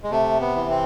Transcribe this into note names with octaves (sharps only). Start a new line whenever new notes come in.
G#3
C3 A3
B3
E3
C4